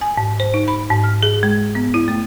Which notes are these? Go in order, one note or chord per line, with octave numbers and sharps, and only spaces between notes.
G#5
G#2
C5
D#4
B5
G#2
F6
G#4
G#3
B3
E4
A3